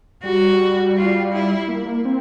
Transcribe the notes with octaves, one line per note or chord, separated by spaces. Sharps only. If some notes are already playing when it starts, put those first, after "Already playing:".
G3 F#4
F4
E4
A#3
C4